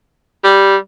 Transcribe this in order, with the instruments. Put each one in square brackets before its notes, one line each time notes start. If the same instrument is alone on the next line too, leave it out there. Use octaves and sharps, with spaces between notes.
[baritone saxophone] G3